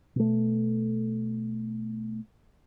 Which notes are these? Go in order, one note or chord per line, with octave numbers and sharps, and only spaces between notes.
B2 A3